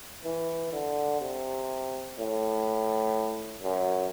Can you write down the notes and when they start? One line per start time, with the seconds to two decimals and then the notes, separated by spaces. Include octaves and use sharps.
0.25 E3
0.73 D3
1.21 C3
2.18 A2
3.63 F#2